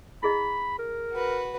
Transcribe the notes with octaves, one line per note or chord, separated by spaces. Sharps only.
E4 G#4 D#5 B5
A#4
F#4 B4